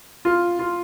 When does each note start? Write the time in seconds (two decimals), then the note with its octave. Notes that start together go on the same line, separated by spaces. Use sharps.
0.25 F4
0.59 F4